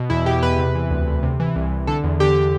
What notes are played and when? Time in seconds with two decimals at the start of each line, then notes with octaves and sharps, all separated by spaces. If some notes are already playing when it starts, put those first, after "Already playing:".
Already playing: B2
0.10 E2 E4
0.26 B2 G4
0.43 E2 B4
0.59 C3
0.75 E3
0.91 D2
1.07 D2
1.23 C3
1.40 E3
1.56 C2
1.72 C2
1.87 D3 A4
2.04 E2
2.20 D3 G4